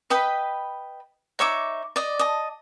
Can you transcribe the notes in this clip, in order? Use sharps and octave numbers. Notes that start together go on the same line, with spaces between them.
B4 D#5 G5 B5
D#4 C#5 E5 D6
D5 D#5
D#5 A5